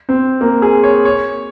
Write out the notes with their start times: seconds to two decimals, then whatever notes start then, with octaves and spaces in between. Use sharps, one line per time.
0.09 C4
0.41 A#3
0.62 G#4
0.83 C#5
1.05 C#5